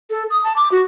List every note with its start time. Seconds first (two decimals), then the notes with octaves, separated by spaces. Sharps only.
0.10 A4
0.30 D#6
0.44 A5
0.56 D6
0.72 F#4